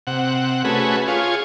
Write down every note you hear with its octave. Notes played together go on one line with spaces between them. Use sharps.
C3 F#5
A3 C#4 F#4 G#4 B4
F4 G#4 C#5